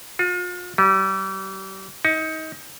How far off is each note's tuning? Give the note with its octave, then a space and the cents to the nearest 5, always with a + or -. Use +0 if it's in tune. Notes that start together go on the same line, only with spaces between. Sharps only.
F4 +40
G3 -35
D#4 +25